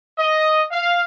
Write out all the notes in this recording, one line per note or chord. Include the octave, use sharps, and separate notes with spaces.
D#5
F5